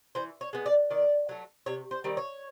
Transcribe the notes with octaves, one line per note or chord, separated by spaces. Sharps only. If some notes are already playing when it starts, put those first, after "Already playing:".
E3 C5
C#5
G#3 B3
D5
D#3 D5
F#3 A3
C3 C#5
C5
D#3 G3 C4
C#5